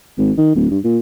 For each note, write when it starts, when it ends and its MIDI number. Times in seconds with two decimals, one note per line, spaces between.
0.18 0.32 32
0.37 0.50 51
0.55 0.69 26
0.70 0.79 43
0.84 0.99 46